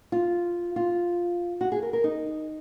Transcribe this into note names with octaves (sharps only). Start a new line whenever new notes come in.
F4
F4
F#4
G#4
A#4
A#4
D#4